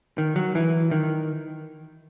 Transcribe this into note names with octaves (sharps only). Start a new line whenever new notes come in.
D#3
F#3
E3
D#3